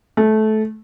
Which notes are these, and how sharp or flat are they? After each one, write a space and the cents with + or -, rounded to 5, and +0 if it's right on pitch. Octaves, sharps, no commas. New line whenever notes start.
A3 -20